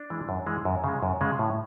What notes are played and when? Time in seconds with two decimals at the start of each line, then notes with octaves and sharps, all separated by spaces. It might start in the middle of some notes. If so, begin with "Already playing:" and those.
Already playing: D4
0.10 E3 G#3
0.29 F#2
0.47 E3 G#3
0.65 F#2
0.84 C#3 G#3
1.03 F#2
1.21 C#3 G#3
1.39 A2